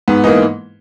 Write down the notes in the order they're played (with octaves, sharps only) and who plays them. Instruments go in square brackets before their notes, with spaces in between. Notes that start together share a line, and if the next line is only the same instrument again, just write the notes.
[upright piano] G#2 B3
E3 A#3 D#4